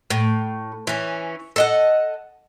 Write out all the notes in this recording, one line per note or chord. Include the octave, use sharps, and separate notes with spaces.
A2
E3 C#4
A4 D#5 F#5